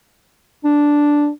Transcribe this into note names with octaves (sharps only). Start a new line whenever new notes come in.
D4